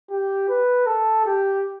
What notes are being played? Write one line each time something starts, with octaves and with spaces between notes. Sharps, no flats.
G4
B4
A4
G4